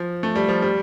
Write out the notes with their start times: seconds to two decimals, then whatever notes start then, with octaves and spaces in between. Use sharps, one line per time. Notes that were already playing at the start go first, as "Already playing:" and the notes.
Already playing: F3
0.23 A3
0.36 G3
0.49 F3
0.62 G3